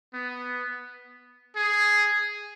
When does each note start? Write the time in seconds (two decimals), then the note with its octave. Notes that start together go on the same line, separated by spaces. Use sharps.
0.13 B3
1.56 G#4